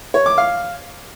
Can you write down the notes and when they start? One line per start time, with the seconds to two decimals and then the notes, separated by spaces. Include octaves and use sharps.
0.14 C#5
0.26 D6
0.38 F5